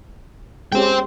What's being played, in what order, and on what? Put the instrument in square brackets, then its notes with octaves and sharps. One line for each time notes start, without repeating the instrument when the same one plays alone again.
[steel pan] G#3 C#4 G4 [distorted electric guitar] C5 G5